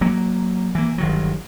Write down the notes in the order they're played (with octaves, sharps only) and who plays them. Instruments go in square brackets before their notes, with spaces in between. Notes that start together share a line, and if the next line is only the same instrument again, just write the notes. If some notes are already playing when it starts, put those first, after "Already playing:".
[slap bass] F#3 A#3
E3 A#3
G1 D#3 F#3